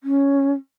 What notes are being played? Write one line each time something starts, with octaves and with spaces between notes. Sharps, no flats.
C#4